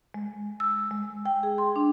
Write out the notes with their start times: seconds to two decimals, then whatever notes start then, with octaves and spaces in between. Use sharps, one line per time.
0.14 G#3
0.60 E6
0.91 G#3
1.26 G5
1.43 G#4
1.58 C6
1.76 D4